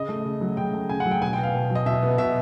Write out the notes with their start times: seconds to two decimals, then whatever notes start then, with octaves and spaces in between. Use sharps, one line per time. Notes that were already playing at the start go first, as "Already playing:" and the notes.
Already playing: C#3 D#5
0.09 A3
0.25 C#3
0.41 F#3
0.57 C#3 G5
0.73 A3
0.89 C#3 G#5
1.00 F#5
1.06 F#3
1.11 G5
1.22 B2 G#5
1.33 G5
1.38 B3
1.43 F5
1.54 B2
1.70 F#3
1.75 D#5
1.86 B2 E5
2.03 B3
2.18 B2 E5